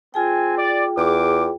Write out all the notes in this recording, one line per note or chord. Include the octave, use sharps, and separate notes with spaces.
C4 F4 G#4 G5 G#5
D5
E2 D6